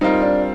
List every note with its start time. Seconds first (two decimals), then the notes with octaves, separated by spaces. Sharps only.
0.01 G3 C4 D#4 F4 A#4
0.22 D4